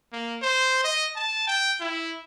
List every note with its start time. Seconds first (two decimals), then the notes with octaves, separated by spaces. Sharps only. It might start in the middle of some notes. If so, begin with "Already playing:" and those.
0.12 A#3
0.42 C5
0.84 D#5
1.16 A5
1.47 G5
1.80 E4